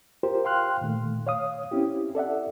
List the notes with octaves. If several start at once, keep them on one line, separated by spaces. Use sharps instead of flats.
F4 G4 A#4 C5
F5 G5 C6 F6 F#6
A#2 D#3 A3
C#5 F5 D#6
C4 C#4 E4 G4
A4 D5 E5 F#5